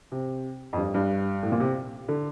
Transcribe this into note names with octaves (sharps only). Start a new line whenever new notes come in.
C3
F2
G2
G2
A2
A#2
C3
D3